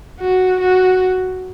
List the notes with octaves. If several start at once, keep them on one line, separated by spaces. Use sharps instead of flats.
F#4
F#4